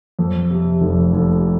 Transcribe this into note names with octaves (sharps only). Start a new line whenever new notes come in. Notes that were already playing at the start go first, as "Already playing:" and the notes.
F2
C3
F1
F1